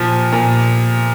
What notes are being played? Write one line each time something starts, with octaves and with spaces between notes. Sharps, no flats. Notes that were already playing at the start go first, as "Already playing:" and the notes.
Already playing: A#2 F3
A#2